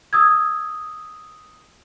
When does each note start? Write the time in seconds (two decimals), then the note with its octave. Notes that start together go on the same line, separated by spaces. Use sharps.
0.13 D#6 E6 G#6